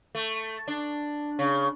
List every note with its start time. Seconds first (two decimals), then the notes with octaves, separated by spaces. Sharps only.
0.15 A3
0.68 D4
1.39 C#3